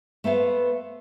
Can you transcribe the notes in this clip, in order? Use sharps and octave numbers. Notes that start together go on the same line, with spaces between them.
A3 B3 C5 F5